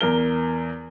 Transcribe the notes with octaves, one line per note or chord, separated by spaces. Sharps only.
E2 A#4 G7